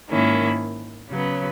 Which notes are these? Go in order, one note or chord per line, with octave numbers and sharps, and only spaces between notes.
G#2 D#3 A#3 C#4 E4
C#3 F#3 B3